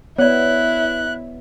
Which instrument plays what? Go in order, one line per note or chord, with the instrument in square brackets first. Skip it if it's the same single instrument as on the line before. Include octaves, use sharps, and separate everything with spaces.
[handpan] B3 [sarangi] E4 [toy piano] C#5 D5 [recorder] F#6